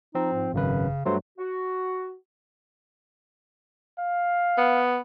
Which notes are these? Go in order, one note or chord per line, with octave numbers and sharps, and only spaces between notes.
F3 C4 D#4
G#2
G#1 F#2 C#3 B4
G2 F#3 A3 C5
F#4
F5
B3